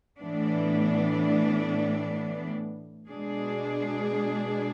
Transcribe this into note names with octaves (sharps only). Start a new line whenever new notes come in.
A2 E3 B3 D4
B2 G#3 D4 G#4